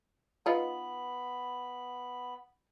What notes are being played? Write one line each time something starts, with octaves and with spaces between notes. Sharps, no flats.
B3 D#4 F4 B4 B5